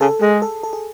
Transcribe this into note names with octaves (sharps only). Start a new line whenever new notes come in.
C#3 A4
G#3 G#4
A4
A4
G#4